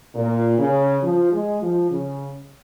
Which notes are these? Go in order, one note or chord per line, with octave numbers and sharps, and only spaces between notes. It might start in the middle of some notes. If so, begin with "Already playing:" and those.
A#2
C#3
F3
G#3
F3
C#3